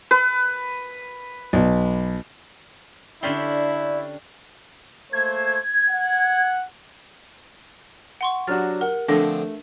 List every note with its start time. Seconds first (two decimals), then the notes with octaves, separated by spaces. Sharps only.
0.11 B4
1.53 B1
3.23 D3 C#4 D4 E4 G4 D5 G#5 C6
5.13 A3 A#3 C5 G#6
5.90 F#5
8.21 F#5 C6 C#6
8.47 F#3 D4 F#4 G4 F6 A6
8.81 A#4 F#5
9.08 D3 F3 A3 C4 D4 A#6